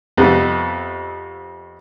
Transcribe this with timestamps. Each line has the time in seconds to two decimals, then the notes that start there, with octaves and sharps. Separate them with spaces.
0.17 F2 C3 B3